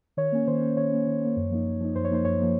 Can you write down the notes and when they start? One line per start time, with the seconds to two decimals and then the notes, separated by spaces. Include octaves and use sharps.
0.17 D#3 C#5
0.32 A#3 C#4
0.47 D#3 C5
0.62 A#3 C#4
0.77 D#3 C#5
0.92 A#3 C#4
1.07 D#3
1.21 A#3 C#4
1.37 F#2
1.51 F3 A#3 D#4
1.65 F#2
1.80 F3 A#3 D#4
1.95 F#2 C5
2.05 C#5
2.10 F3 A#3 D#4 C5
2.25 F#2 C#5
2.40 F3 A#3 D#4